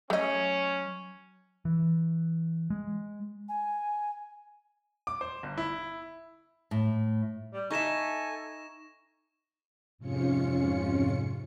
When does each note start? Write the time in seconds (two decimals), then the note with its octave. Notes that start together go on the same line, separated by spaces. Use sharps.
0.10 F#3 A3 C#4 D#5
1.65 E3
2.70 G#3
3.48 G#5
5.07 D6
5.21 C5
5.43 G1
5.58 E4
6.71 A2
7.53 G3
7.71 D#4 A4 E5 G#5 C#6 A#6 E7
9.98 F2 G#2 C3 C#4 F4 C#7